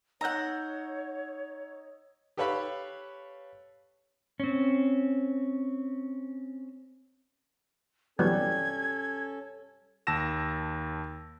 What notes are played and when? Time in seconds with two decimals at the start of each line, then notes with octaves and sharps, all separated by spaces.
0.21 D#4 C#5 F#5 A#5 E6 G6
2.37 G4 A4 B4 C#5 F5 B5
4.40 C4 C#4
8.19 E3 F#3 G3 B3 C#4 A4 G#6
10.07 D#2 A5 E6 A#6 E7